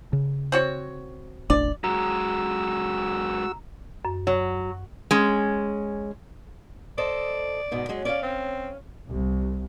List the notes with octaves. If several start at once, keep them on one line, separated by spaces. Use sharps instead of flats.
C#3
C4 F#4 C#5
E1 A1 D4 D5
F#2 G#3 F#4 A#5 E6
F#2
F#3
G#3 C#4
A4 C5 D5 D#5
G#2 B2 D#4
F#3 G#3 C#4
C#4 C#5 D5 F5
C4
C2